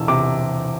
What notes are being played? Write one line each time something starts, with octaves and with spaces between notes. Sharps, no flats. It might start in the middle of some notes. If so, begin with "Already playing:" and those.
Already playing: E1 E3 E6
C3 D6